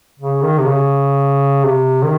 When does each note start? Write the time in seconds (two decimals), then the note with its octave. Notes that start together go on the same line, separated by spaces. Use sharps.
0.19 C#3
0.43 D#3
0.59 C3
0.67 C#3
1.65 C3
2.03 D#3